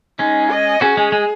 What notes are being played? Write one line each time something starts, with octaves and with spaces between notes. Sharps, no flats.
G#3 C#4 D#4
D#5
C#4 F#4 G#4
G#3 C#4
G#3